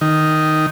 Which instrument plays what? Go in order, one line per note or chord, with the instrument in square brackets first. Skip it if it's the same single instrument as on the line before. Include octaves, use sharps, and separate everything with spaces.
[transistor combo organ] D#3